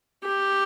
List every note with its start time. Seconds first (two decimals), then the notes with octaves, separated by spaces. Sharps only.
0.24 G4